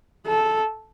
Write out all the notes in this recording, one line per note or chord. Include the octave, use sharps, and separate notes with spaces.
A4